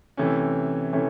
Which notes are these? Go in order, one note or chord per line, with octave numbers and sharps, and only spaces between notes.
C3 E3 A3 C#4
C3 E3 A3 C#4